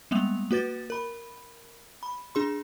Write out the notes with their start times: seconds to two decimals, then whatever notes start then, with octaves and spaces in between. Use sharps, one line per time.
0.11 G3 G#3 A#3 B3 F7
0.51 A#3 F#4 B4 A6
0.90 A#4 B5
2.03 B5
2.35 D4 G#4 C6